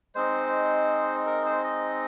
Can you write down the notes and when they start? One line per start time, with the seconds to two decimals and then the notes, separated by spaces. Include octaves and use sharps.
0.15 G#3 C4 D#4 C5
1.26 A#4
1.46 C5
1.63 D#5